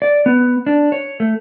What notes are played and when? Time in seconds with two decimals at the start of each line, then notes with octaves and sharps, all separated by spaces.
0.02 D5
0.26 B3
0.67 D4
0.92 C#5
1.20 A3